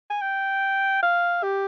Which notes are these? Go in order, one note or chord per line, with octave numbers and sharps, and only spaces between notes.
G#5
G5
F5
G4